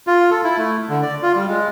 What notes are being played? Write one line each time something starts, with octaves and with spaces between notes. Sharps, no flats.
F4
A4
E4
A3
D3
D5
F4
G3
G#3